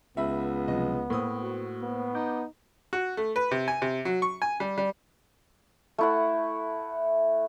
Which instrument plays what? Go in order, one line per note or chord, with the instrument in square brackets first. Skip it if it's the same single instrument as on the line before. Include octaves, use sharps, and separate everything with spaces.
[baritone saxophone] C#2 [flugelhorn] B3 [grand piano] E5 B5
[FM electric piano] C3 F3 F#3 [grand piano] D#5
[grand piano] A2 D#6 [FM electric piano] A#3 C5
[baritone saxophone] F#4
[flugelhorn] B3
[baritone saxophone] D#4 [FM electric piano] D6 G6
[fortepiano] F#4
A3
B4
C3
G#5
C3
F#3
C#6
G#5
G3
G3
[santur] A3 E4 F#5